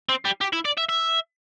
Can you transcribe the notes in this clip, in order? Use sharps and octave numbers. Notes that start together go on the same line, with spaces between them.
C4
G3
G4
E4
D5
E5
E5